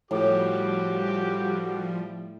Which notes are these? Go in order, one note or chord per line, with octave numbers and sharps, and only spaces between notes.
A2 F3 G3 F#4 G4 D6